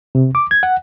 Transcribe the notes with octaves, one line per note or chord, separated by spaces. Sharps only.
C3
D6
G#6
F#5